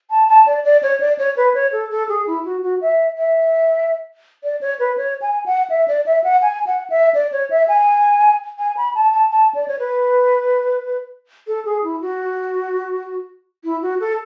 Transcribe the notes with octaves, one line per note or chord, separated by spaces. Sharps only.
A5
A5
D5
D5
C#5
D5
C#5
B4
C#5
A4
A4
G#4
E4
F#4
F#4
E5
E5
D5
C#5
B4
C#5
G#5
F#5
E5
D5
E5
F#5
G#5
F#5
E5
D5
C#5
E5
G#5
G#5
B5
A5
A5
A5
D5
C#5
B4
A4
G#4
E4
F#4
E4
F#4
A4